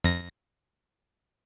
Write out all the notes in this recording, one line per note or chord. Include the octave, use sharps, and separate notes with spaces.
F2 A#6